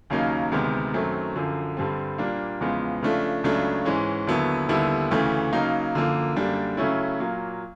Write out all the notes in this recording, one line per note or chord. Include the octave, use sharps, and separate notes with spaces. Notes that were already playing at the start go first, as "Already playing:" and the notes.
D#2 C#3 F#3 A#3 D#4
D2 C3 D#3 G#3 B3
F#2 D#3 F#3 A3 C4
F#2 D3 F3
G2 D3 G3 C4
A#2 G3 A#3 D4
E2 C#3 F3 G#3 B3
C#3 F3 A3 D4
C#2 C#3 F#3 A3 D4
G#2 E3 G#3 C#4
D#2 D3 F#3 B3 E4
D#2 D3 G3 B3 E4
D2 C#3 E3 A3
C#3 F#3 A#3 D#4
F#2 D3 F3 A#3
F#2 D3 G3 A#3 D4
C#3 F#3 A3 C#4 E4
A#2 F#3 A#3